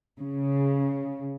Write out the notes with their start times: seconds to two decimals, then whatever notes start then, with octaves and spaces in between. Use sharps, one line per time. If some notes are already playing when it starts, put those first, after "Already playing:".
0.19 C#3